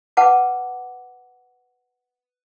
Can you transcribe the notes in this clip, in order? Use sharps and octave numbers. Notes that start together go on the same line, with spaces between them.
B4 F#5 A5 D6